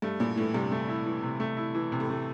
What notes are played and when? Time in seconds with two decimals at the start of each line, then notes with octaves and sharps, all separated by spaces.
0.02 G2 A3
0.20 A#2 E4
0.36 A2 E3
0.54 G2 C3
0.71 A3
0.89 E4
1.06 E3
1.23 C3
1.40 A3
1.57 E4
1.75 E3
1.92 C3
2.00 A2
2.09 A3